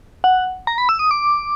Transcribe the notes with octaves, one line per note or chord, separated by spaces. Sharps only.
F#5
A#5
B5
E6
D#6
D6